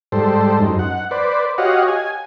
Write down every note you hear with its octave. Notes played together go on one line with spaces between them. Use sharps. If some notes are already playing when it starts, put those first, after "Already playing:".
G#2 G3 A4 C5
F#2 D#4
F#5
B4 C5 D5
F#4 G4 C#5 D#5 F5 F#5
G#5